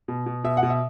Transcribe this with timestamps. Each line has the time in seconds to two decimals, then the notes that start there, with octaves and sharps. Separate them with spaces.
0.08 B2
0.26 B2
0.44 B2 E5
0.57 F#5
0.63 B2
0.70 E5